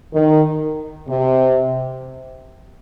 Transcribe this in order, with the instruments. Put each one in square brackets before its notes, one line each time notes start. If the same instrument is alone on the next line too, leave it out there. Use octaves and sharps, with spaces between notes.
[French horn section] D#3
C3